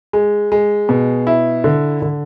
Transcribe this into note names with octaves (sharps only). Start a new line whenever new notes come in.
G#3
G#3
B2
E4
D3
D3